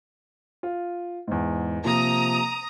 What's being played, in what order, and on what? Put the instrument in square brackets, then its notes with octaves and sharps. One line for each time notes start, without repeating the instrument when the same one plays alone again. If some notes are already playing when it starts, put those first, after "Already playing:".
[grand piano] F4
E2 G#2
[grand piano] C3 F3 A#3 [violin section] A#5 D#6